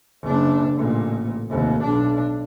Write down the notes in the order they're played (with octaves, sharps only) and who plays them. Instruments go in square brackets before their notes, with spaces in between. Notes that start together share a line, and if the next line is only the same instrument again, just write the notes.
[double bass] F#1 D4
A1 A#2
F1 D#2
B1 D4